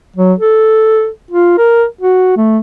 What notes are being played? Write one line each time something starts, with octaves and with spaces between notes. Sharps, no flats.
F#3
A4
F4
A#4
F#4
A3